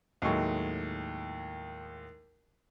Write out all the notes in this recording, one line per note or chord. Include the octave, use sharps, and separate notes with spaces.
D#2 A2 F#3 G#3 C#6